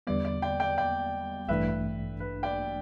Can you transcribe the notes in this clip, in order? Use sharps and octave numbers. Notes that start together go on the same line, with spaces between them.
E2 D3 G3 B3 D5
D5
D5 G5
D5 G5
D5 G5
A1 G2 E3 A3 D4 B4 E5
B4
D5 G5